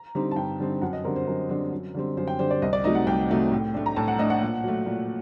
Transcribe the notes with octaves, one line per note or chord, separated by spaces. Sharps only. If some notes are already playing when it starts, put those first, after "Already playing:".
Already playing: A#5
D3 G3 C4 D#4
A5
G2 G5
D3 G3 C4 D#4
F#2 F#5
D#5
D3 G3 C4 A#4
C5
F#2 A#4
D3 G3 C4
F#2
D3 G3 C4
F#2 C5
G5
D3 G3 C4 C5
D5
C2 D#5
D5
C3 F#3 A3 D#4 D#5
F#5
C2 G5
C3 F#3 A3 D#4
A2
A3 D4
A#5
A2 A5
F#5
A3 D4 D#5
F#5
A#2
F#3 A3
A#2